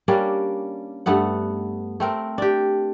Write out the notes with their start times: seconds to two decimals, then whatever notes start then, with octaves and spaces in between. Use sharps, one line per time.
0.08 G3 A#3 C#4 D4
1.06 G2 A3 B3 F#5
2.00 A3 C4 A#4
2.38 D4 G4